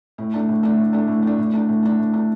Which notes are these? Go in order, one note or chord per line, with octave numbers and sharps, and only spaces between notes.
A2
A3 D4
A2
A3 D4
A2
A3 D4
A2
A3 D4
A2
A3 D4
A2
A3 D4
A2
A3 D4